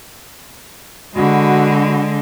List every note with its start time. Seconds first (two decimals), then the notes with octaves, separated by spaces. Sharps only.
1.15 D3 G#3 F#4 B5